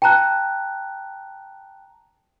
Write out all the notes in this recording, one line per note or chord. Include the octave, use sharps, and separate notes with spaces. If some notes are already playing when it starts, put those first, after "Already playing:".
G5 A5 A#5 F#6